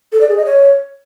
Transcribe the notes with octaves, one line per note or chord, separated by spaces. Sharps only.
A4
D5
G#4
D#5
C#5